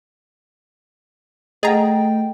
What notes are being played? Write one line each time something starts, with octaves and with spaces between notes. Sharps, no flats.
A3 G#4 D#5 F#5 G5 A#5